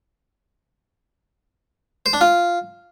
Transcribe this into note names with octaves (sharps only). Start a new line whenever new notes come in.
C5
D4
F4